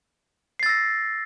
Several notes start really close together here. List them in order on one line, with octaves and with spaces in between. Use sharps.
C7 A6 E6 A#6